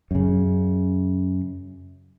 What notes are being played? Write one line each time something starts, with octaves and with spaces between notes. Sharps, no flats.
F#2 C#3